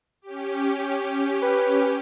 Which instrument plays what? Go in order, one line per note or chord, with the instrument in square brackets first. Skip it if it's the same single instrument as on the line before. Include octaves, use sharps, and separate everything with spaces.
[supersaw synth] C#4 G4
[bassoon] B4